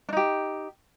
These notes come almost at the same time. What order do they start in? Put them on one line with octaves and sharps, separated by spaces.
D4 D#4 G4